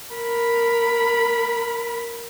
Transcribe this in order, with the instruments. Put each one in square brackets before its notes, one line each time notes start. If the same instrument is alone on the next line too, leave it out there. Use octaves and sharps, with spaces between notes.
[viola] A#4 B5